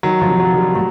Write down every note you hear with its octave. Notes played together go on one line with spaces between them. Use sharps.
D#3 F#3
F3
C3
F#3
D#3
G3
A2 F#3